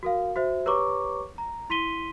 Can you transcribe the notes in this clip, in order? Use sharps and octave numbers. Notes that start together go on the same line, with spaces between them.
F#4 A#4 F5
F#4 C5 E5
G4 B4 C#5 A#5 C#6 D6
A#5
E4 C6 B6 D#7 G7